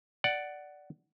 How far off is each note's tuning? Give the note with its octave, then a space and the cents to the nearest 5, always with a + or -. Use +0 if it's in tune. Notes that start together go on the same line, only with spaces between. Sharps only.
D5 +0 F#5 +10